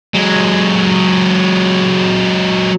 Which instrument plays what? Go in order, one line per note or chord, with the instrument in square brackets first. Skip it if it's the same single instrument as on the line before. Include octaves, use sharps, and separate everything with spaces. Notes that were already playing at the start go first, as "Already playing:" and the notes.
[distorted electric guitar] F#3 G#3